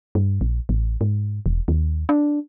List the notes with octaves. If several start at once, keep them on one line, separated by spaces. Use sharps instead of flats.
G2
A#1
A1
G#2
E1
D#2
D4